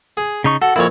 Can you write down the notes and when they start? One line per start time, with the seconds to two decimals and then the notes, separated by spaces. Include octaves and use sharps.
0.17 G#4
0.44 C#3 D#4 A5 C#6
0.62 F#4 A4
0.76 F2 A#2 E4 C#5